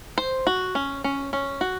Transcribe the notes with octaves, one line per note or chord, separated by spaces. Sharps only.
C5
F#4
C#4
C#4
C#4
F#4